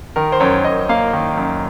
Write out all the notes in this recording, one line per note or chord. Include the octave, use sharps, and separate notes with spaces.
D#3 A#4
C5
F#2 C#5
F#2 D#5
A#3 F5
D#3
F#2